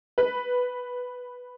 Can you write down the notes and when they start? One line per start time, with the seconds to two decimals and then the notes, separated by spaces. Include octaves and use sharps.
0.18 B4